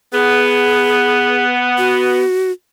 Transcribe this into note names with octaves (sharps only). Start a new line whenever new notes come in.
B3 G#4
F#4